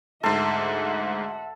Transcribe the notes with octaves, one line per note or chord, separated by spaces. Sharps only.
D2 G#2 A4 E5 F#5 C6